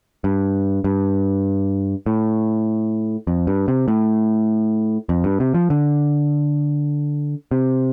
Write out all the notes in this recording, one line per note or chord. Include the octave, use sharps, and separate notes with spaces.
G2
G2
A2
F2
G2
C3
A2
F2
G2
C3
F3
D3
C3